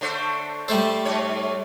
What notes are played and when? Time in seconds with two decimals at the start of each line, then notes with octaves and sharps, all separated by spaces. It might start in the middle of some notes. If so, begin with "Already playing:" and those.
0.01 D3 A3 C5
0.68 G3 A3 A4 C5
1.05 G#2 C#5